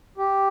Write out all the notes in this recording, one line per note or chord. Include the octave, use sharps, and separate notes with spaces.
G4